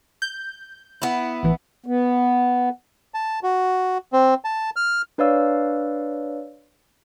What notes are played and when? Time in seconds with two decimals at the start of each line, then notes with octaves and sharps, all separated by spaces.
0.22 G6
1.02 B3 E4
1.43 A1 E3
1.86 B3
3.14 A5
3.43 F#4
4.13 C4
4.44 A5
4.76 F6
5.18 D4 B4 C#5 D5 F5 E6